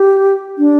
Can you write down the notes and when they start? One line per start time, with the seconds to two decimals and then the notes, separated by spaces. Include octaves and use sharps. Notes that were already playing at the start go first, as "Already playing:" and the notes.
Already playing: G4
0.58 D4